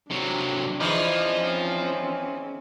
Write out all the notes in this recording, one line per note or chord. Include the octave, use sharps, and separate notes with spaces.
C3 F#3 D4
E2 E3 F3 D#4
C4 C#4